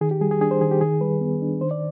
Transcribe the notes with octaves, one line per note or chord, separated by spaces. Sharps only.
D#3 G#4
G4
G3 G#4
G#4
D4 G#4
C5
D#3 G#4
G4
D#3 G#4
G3 B4
B3
D4
D#3 C5
D5